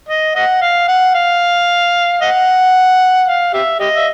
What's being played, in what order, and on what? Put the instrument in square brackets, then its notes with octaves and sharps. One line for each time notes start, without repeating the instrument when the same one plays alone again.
[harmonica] D#5
D#5 F#5
F5
F#5
F5
D#5 F#5
F5
G4 E5
G4 D#5
E5